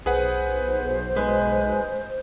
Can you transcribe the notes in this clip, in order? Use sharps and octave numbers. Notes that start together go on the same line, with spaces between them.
B1 G#4 B4 C5 F#5
G#3 B4